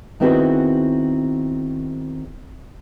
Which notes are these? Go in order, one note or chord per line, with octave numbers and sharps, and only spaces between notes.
D#3 B3 C4 E4 F#4 G#4